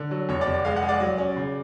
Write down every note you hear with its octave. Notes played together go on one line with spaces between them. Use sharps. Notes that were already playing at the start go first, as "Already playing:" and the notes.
Already playing: D3
F#3
F1 C#5
D5
F1
D5
G#3 F5
F#5
G#3
D5
F#3
C#4
C#3